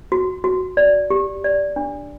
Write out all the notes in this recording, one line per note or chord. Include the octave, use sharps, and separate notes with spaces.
F#4
F#4
D5
G4
D5
D4